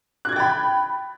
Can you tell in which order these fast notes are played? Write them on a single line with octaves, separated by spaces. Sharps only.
F#6 G#6 A6 G5 B5